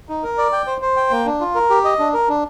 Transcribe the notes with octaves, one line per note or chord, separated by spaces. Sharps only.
D#4
A#4
D5
G5
C5
C5
G5
A#3
D4
F4
A#4
G4
D#5
D4
A#4
D4